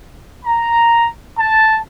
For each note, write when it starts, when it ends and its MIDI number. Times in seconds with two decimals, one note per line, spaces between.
0.46 1.06 82
1.39 1.78 81